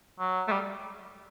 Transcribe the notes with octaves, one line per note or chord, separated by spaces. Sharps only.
F#3
A3
G3